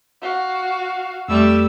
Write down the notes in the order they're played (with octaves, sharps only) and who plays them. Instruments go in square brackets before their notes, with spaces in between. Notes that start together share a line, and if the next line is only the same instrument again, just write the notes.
[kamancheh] F#4 F5
[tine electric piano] F2 [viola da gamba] G3 A3 [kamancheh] E6